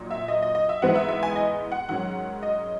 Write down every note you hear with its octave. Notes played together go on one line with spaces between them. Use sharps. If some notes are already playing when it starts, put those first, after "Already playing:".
Already playing: A#2 F#3 D#4
E5
D#5
D#5
D#5
E5
G#2 E3 B3 D#4 F#5
E5
E5
G#5
D#5
F#5
G#2 D#3 F#3 C#4 F#5
D#5